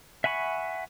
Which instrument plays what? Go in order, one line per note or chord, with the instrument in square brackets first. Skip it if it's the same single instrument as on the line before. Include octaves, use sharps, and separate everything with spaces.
[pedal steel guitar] E5 F#5 G#5 B5 C#6